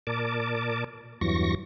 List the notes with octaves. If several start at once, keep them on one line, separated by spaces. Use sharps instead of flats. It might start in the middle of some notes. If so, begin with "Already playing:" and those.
A#2 A#4 D5 A5 D6
E2 G2 E3 F#3 C#6 A#6